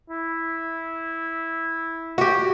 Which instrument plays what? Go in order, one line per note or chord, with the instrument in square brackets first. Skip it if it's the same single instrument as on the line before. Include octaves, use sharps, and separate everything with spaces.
[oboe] E4
[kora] F#4 G4